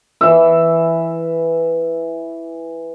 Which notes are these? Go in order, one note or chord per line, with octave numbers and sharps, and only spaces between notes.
E3 E5